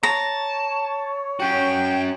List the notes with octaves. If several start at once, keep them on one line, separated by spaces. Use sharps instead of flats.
C#5 A5 A#5
C#4 F#4 G5